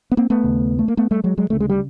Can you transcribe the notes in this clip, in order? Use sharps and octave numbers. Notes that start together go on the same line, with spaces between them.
B3
A#3 C4
A3 B3
D#2 C#3
A3
A#3
A3 B3
G3 A3
F#3 G#3
F#3 G#3
D2 C#3 A3
G#3
G3